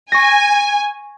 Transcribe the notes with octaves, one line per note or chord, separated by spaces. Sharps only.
G#5 C#6 A#6